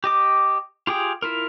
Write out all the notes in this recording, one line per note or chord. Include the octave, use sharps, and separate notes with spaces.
G4 D#5 D6
F4 G4 G#4 G5
E4 F4 A#4